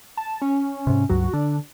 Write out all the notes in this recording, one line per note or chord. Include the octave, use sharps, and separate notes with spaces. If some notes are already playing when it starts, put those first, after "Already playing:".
A5
C#4
G#2 C3
C#2 G2 F#3 F#4
D3 D4